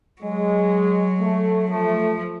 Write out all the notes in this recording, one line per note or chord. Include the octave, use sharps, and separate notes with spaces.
F#3 G#3
A3
F3 A3